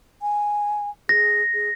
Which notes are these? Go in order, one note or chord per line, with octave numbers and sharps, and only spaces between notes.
G#5
G#4 A#6
G#4